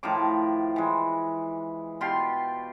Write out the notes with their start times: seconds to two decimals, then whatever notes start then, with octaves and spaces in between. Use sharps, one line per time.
0.03 A2 D#3 F3 D6
0.76 E3 G#3
2.01 B2 F4 G4 C6